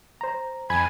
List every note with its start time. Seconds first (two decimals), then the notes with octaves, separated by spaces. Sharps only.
0.21 C5 A#5
0.70 F2 G#5 B5 G#6